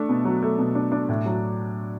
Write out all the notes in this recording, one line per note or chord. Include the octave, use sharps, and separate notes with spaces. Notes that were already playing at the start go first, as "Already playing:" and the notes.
Already playing: A3 D4
B2
F#3
A3
B2
D4
D4
A2
F#3